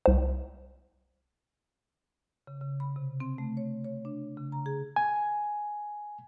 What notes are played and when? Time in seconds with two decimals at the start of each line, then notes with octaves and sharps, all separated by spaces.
0.06 C2 C5
2.47 C#3
2.61 C#3
2.80 B5
2.96 C3
3.20 C4
3.38 A3
3.57 C#5
3.84 C#5
4.05 D4
4.37 C#3
4.52 A#5
4.66 G#4
4.96 G#5